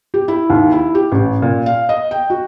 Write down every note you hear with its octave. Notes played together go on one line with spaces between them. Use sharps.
G4
E4
D#2
E4
G4
A1
A#2
F5
D#5
G5
F#4